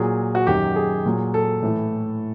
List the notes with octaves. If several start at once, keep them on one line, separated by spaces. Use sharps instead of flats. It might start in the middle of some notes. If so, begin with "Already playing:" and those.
Already playing: A#2 F#3 G#4
F#4
F#2 D#3 F#3 G4
G#4
A#2 F#3
A4
A2 E3